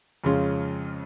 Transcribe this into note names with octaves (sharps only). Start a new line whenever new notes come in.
F2 C#3 G#3 C#4 F4